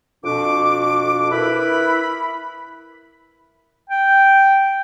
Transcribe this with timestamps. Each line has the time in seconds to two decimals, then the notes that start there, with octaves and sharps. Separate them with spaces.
0.24 F2 B2 D4 D6
1.32 E4 A#4 B4 E5 B5
3.89 G5